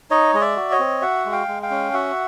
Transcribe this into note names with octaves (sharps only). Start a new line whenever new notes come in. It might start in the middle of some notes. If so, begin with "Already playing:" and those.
D#4 C#5 D#5
G#3 D#5
D5 E5
F#4
C#5 D#5
C4
F#4 E5 F#5
G#3
F5 G5
G#3
F5 G5
C#4
F#4 E5 F#5